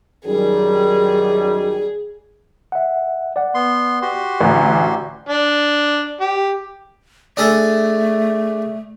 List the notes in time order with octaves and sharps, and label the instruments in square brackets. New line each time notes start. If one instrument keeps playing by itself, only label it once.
[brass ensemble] F#2 D#3 G3 [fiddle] G#4
[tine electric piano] E5 F#5
D5 F#5
[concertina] B3 C6
F#4 G4 C6
[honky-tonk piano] A1 D2 [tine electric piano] D5 F#5 A#5
[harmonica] D4
G4
[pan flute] A3 [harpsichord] D4 G#4 A4